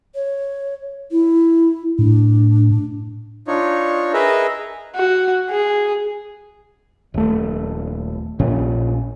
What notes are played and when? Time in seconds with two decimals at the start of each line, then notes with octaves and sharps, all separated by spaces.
0.14 C#5
1.11 E4
1.99 A2 D4
3.47 D4 D#4 F4 C#5
4.13 G#4 A#4 B4 D#5 E5
4.96 F#4
5.50 G#4
7.14 D#1 A3
8.39 A#1 A#2 C#4